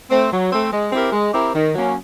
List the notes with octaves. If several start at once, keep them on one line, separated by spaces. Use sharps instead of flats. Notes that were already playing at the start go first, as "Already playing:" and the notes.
A3 C4
F#3
A3 C4
G#3
C4 E4 G4 A#4
G#3
C4 E4 G4 A#4
D#3
F#3 A#3 C#4